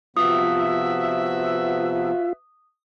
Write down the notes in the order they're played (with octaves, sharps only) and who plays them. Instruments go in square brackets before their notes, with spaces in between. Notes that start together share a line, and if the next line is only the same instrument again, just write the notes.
[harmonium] C3 F3 B3 [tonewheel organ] F4 [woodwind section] F#4 B4 E5 [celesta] D#6